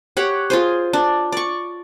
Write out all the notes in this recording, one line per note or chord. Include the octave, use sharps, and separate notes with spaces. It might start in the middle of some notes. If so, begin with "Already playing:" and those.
G4 C#5 F#5
F4 G#4 C5
D4
D5 C#6